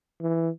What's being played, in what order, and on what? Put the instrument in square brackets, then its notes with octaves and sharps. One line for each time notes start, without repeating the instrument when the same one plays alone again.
[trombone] E3